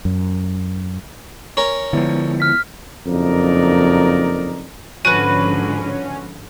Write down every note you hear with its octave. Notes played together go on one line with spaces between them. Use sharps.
F#2
C#4 A#4
D3 F3 G#3 B3 E4
F6 B6
F#1 F2 D#4 A#4 D5
G#2 D3 F3 C#4 F#4 B4 D#7